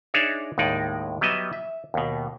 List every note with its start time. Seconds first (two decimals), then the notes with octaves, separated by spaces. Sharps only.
0.14 D4 D#4 G#4 C#5 D5 E5
0.58 D#2 A2 G#3 D#4 D5
1.21 F#3 G3 B3 D#5 E5
1.53 E5
1.94 D#2 B2